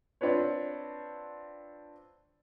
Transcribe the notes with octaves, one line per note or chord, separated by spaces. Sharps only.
C4 D4 F4 B4 C#5